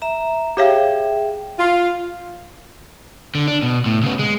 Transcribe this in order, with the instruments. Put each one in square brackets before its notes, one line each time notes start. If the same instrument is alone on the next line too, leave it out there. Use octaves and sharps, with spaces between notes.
[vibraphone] E5 A#5
[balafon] G4 C#5 F5 [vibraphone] G#4 E5 G5
[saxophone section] F4
[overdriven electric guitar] D3
D4
B2
A2
C#3 B3
G#3